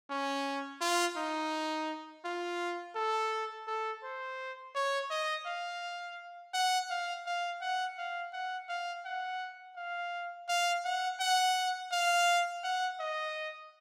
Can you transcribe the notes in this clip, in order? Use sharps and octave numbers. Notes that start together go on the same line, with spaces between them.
C#4
F4
D#4
F4
A4
A4
C5
C#5
D#5
F5
F#5
F5
F5
F#5
F5
F#5
F5
F#5
F5
F5
F#5
F#5
F5
F#5
D#5